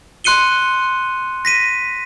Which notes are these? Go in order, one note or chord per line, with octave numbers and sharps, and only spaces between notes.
C6 F#6 C#7 D#7 G7
A#6 B6 D#7